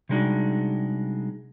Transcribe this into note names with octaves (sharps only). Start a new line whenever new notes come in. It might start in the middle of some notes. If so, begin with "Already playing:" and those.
C3 G3 G#3 D4 D#4 F#4